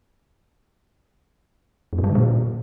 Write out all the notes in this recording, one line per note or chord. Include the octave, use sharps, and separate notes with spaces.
F#2
G#2
G3
D3
A#2